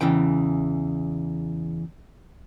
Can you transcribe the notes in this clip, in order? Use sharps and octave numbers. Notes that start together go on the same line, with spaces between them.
E2 C#3 E3 G5